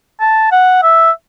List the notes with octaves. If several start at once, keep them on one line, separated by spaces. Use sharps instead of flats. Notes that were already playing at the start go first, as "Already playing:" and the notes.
A5
F#5
E5